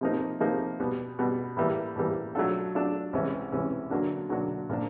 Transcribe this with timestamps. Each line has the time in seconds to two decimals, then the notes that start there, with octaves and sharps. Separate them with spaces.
0.01 C3 F3 A#3 D#4
0.40 C3 F3 A#3 D#4
0.80 B2 G3 B3
1.19 B2 G3 B3
1.57 A2 E3 G3 A#3
1.96 A2 E3 G3 A#3
2.35 F#3 A3 D4 F4 A4
2.75 F#3 A3 D4 F4 A4
3.13 C2 C3 E3 G#3 C#4
3.52 C2 C3 E3 G#3 C#4
3.90 D3 F#3 A#3 D4 F#4
4.29 D3 F#3 A#3 D4 F#4
4.69 A#2 F3 A#3 D4